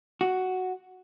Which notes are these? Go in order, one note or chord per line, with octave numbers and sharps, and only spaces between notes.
F#4